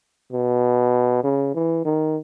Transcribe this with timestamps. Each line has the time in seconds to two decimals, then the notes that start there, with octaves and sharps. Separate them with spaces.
0.32 B2
1.23 C#3
1.54 E3
1.85 D#3